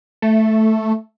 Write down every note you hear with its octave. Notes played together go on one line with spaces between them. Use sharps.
A3